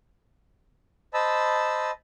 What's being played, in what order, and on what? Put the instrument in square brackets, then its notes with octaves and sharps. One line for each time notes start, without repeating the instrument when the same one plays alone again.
[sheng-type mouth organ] C5 D#5 A5 B5 E6